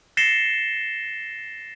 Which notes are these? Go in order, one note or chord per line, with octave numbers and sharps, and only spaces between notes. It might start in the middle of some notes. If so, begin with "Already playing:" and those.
A6 A#6 C7 C#7 E7 G7